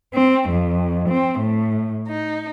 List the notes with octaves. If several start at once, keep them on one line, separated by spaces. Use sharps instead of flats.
C4
F2
C4
A2
D#4